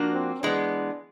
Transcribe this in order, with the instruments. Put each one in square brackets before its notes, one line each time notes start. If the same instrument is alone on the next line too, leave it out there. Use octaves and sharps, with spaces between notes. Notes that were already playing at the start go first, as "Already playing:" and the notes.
Already playing: [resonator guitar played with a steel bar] F3 A#3 D4 F#4
[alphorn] C4
[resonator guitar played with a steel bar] E3 G#3 B3 [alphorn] D4